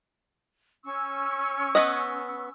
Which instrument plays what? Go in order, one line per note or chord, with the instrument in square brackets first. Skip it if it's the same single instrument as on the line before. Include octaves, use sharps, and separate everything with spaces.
[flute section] C#4 C#6 E6
[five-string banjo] B3 B4 D#5